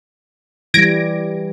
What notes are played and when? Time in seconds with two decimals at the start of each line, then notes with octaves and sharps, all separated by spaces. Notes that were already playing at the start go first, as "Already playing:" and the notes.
0.74 E3 G3 G#6 A#6 D7